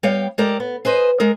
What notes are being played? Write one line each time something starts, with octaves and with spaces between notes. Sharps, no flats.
G3 B3 C#5 F5 G5
G#3 G4 A4 A#4 D5
B3
G#4 B4 C5 D#5
G#3 G#4 A#4